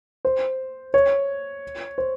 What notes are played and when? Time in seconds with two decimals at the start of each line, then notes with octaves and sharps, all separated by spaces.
0.25 C5
0.94 C#5
1.98 C5